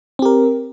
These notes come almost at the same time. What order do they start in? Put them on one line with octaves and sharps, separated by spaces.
C4 G4 A#4